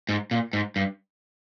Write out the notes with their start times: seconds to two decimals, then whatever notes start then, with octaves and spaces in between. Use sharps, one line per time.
0.09 G#2
0.31 A#2
0.53 G#2
0.76 G2